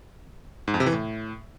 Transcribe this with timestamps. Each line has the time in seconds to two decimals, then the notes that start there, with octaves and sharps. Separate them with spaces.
0.68 G#2
0.74 F2
0.80 C3
0.86 E3
0.93 A2